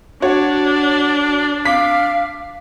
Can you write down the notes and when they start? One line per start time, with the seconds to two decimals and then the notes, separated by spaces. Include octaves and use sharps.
0.22 D4 F#4 C#5
1.65 F5 D6 B6